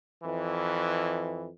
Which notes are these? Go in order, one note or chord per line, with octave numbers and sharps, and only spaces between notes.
F2 E3